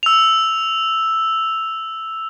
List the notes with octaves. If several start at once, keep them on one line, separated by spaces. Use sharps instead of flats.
E6 F7